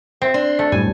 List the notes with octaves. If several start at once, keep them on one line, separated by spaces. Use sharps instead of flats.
C4 E5
D4 C6
A3
F#2 A2 G3 G#5